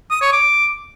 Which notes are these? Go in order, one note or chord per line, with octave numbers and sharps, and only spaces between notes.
D#6
C#5
D6